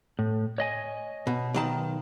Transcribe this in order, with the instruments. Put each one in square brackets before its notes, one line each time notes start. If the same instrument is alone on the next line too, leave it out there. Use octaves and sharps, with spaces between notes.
[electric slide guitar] A2
C#5 D#5 G#5
[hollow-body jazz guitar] B2
B1 D#3 A5